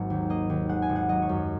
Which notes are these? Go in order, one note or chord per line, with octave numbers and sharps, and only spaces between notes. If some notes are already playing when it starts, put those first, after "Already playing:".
Already playing: G#1 F#3 A#3
D#2
A#3 D#5
D#2
G#3 F#5
G#5
G#1
F#5
F#3 D#5
C#5
F#2